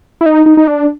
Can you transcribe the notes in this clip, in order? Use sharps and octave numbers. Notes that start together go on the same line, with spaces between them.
E4
D#4
D#4
D#4
D4